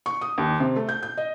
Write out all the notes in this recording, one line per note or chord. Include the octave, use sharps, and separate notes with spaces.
C#6
D#6
D#2
C3
A3
G6
G6
D#5